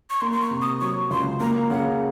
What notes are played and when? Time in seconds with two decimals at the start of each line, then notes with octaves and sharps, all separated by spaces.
0.10 C#6
0.21 A#3 C6
0.32 C6
0.42 C#6
0.51 C3
0.62 D#6
0.81 F#3 C#6
1.11 C#2 C6
1.40 A#3 A#5
1.70 C#3 F#5